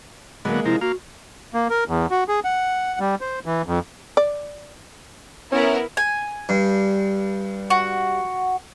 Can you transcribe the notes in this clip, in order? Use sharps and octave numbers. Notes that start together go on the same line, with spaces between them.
D3 F#3 G#3 A#3 B3
C3 F3 E4 A#4
A#3 F#4 F5
A#3
A#4
E2
F#4
G#4
F#5
G3
C5
E3
F2
D5
B3 C#4 E4 A#4
G#5
G2
F#4